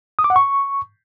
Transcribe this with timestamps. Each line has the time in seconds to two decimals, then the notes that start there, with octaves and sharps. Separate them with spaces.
0.19 D#6
0.24 D6
0.30 F#5
0.36 C#6